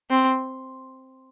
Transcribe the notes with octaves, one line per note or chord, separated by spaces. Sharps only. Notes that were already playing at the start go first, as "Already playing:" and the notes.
C4